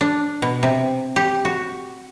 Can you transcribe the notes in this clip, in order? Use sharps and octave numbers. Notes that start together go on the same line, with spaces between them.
D4
B2
C3
G4
F#4